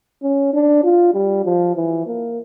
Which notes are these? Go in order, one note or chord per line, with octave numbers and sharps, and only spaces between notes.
C#4
D4
F4
G3
F3
E3
A#3